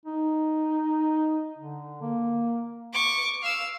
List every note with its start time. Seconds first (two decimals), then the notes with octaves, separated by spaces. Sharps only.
0.06 D#4
1.58 D3
2.02 A#3
2.93 C#6 D6
3.42 F5 E6